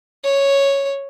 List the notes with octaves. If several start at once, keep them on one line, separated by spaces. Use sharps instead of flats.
C#5